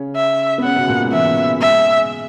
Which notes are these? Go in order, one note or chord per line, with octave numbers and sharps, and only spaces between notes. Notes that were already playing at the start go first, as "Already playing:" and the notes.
Already playing: C#3 C#4
E5
B3
C#3 C#4 F#5
B2 B3
A#2 A#3
G#2 G#3
E3 E4 E5
G#3 G#4 E5